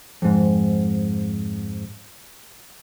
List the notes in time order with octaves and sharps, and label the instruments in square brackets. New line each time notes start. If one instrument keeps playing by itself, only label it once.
[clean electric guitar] F2 G#2